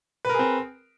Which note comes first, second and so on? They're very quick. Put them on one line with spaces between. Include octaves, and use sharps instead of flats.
B4 A#4 G#4 C4